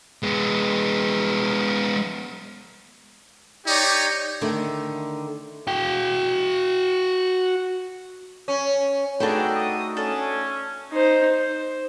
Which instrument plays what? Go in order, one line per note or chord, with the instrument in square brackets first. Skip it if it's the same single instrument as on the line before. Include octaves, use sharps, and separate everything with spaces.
[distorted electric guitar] G#3 B3
[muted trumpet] D#4 [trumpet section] G4 C#5 D5
[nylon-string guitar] D3 D#3 A3 D4
[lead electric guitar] F#4 G5
[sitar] C#4
[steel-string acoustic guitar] A3 D#4 F#4 [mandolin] D4 A4 G5 [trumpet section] G#4 B4
[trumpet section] D#6
[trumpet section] C#4 [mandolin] D4 A4
[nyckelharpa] D#4 C5
C5